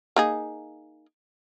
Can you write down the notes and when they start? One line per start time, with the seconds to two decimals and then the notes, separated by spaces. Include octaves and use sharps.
0.16 A#3 D#4 G#4